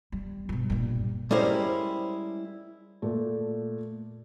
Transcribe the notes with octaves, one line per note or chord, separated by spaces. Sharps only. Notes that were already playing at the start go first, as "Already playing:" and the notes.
G3
G2 B2
G2 A#2
G3 G#3 C#4 E4 A#4 C5
A#2 A3